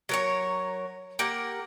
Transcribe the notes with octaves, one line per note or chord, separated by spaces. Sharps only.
F#3 A#4 C#5
A#3 G4 A#4 F#5